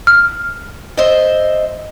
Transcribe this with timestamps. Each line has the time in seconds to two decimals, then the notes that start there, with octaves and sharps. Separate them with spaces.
0.07 F6
0.97 C5 D#5 E5